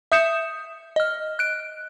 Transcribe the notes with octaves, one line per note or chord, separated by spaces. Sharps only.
E5 D#6 G6 C#7 E7
D#5 F6
F#6 D7